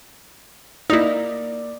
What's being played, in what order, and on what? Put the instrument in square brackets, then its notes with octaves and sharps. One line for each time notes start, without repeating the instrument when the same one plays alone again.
[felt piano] A#3 D5 [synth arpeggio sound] D#4 E4